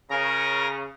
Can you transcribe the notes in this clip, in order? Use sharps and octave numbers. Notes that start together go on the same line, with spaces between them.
C#3 A#4 A#5